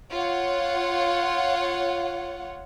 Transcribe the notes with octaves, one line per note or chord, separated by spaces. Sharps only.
F4 C#5 F#5